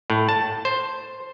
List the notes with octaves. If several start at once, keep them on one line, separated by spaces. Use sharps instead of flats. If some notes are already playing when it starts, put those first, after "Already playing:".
A2
A5
C5